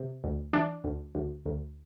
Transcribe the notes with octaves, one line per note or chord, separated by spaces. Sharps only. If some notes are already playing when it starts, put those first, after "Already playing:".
Already playing: C3
D2
E3 D4
D2
D2
D2